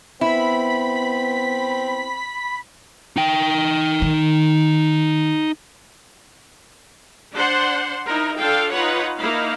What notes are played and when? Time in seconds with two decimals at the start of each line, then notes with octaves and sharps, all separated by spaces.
0.21 B3 C4 E4 B5 B6
3.16 D#4 G5
4.02 D#3
7.35 D4 C5 F#5 C6
8.06 D#4 E4 A#4
8.38 D4 F4 A4 F5 G5
8.71 D#4 F4 B4 C#5 F#5
9.18 A#3 D#4 E4 F5